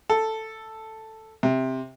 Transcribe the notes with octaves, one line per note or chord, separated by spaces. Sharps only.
A4
C3